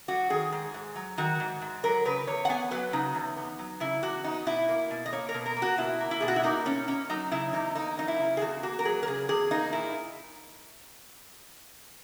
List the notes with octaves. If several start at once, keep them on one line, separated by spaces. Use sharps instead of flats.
F#3 F#4
D#3 G#4
G#2
G#2
F#3
D#3 F#4
G#2
G#2
F#3 A#4
C#3 B4
E2 C#5
F#5
B3 G#5
F#3 B4
C#3 D#4
E2
B3
F#3
C#3 E4
E2 F#4
B3 D#4
B2 E4
A#3
B2
D#5
A#3 C#5
A#4
B2
A#4
A#3
F#4
B2 E4
A#3
E4
B2 G#4
F#4
E4
A#3 D#4
B2 C#4
A#3 C#4
F#3 D#4
C#3 E4
E2 D#4
A#3 D#4
F#3 D#4
E4
C#3
G#4
E2 F#4
A#3 F#4
A#4
F#3 G#4
A#4
C#3 G#4
E2 G#4
A#3 D#4
A#2 E4